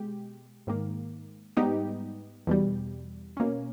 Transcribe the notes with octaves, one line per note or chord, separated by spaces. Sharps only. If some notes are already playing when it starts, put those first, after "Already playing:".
Already playing: B2 G#3 G4
G#2 D#3 A#3
G#2 G3 B3 D#4 G4
E2 B2 G3
B2 A#3 C#4